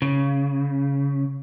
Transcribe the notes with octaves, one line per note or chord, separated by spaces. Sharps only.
C#3